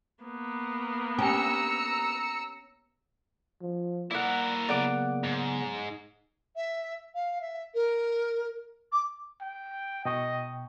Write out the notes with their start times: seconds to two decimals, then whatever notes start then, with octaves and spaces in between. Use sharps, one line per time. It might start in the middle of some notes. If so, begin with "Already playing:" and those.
0.23 A#3 B3
1.19 C#4 G4 A#5 E6 C#7
3.62 F3
4.11 A#3 E4 A#4 D5 F#5
4.69 C#3 F#3 B3 D5 F#5 D6
5.24 G#2
6.56 E5
7.15 F5
7.41 E5
7.75 A#4
8.92 D6
9.41 G5
10.05 B2 D#5 G5 C#6